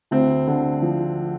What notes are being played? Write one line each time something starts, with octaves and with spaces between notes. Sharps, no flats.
D2 C4
D3
F3